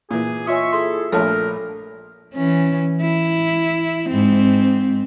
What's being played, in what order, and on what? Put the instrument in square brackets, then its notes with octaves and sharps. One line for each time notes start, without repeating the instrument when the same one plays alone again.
[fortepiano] A#2 E3 [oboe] G#4
[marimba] F4 C#5 G#5 [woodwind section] D#5 C6 C#6 [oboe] E5
[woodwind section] E4 G#4 A4 [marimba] C6
[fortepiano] A#1 A3 [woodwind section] A#2 [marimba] A4 C#5 A5 [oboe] A#4
[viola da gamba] E3 C#4
E4
G#2 C4